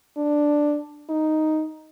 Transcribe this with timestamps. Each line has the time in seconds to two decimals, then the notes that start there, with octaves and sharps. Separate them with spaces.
0.17 D4
1.09 D#4